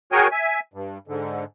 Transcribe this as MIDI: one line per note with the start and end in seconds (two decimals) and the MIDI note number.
0.12 0.27 66
0.12 0.27 68
0.12 0.27 70
0.12 0.27 73
0.12 0.27 79
0.12 0.27 80
0.32 0.60 76
0.32 0.60 80
0.74 0.98 43
1.08 1.44 44
1.08 1.44 50